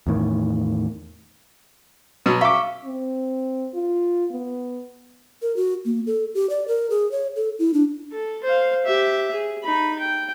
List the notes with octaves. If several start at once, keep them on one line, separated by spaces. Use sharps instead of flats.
E2 A2 D#3
B2 F#3
E5 F5 C#6 D6
C4
F4
B3
A#4
F#4
A#3
A4
G4
D5
A#4
G#4
C#5
A4
E4
D4
A4
C5 F5
G4 E5
G#4
D#4 B5
G5